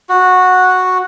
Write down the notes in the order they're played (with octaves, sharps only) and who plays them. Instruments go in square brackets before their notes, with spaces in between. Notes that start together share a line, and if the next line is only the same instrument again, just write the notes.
[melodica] F#4